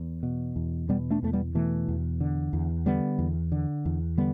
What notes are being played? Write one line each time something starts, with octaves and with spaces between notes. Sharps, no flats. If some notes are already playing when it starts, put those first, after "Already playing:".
Already playing: E2
B2
E2
B2 G3 B3
A3 D4
E2 A3
G3 B3
B2 E3 A3
E2
D3
E2
D3 G3 B3
E2
D3
E2
D3 G3 B3